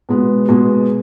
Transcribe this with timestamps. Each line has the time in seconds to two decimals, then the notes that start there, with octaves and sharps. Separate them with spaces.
0.09 B2 G#3 B3
0.48 B2 G#3 B3